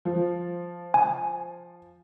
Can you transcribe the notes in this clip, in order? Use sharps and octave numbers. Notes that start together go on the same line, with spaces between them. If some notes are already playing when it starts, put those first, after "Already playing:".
F3
G#5